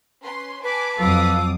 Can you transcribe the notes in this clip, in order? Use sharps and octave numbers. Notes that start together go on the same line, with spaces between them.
C#4 B4 C6
B4 G#5 A5 D6
F2 F#3 A4 F5 D6 D#6